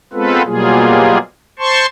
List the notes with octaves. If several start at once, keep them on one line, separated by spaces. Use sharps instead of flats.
G#3 B3 C4 F4 A4 B4
B2 F#3 G3 A#3 F4 G#4
C5 A5 C6 C#6